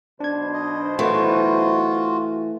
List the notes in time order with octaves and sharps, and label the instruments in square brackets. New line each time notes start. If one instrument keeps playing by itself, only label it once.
[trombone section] B1 B2 C5 [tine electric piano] D4 G#6
[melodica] D#5
[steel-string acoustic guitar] E3 [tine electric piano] A3 [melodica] F4 F#4